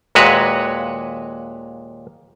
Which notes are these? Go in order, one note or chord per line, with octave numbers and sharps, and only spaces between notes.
D#2 A#2 G#3 F#4 B4 C#5